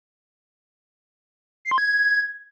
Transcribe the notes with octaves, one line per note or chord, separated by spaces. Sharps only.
C7
C6
G#6